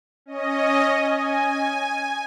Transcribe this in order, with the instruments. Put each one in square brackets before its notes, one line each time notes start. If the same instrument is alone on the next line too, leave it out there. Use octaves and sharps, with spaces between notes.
[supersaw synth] C#4 D#5
G#5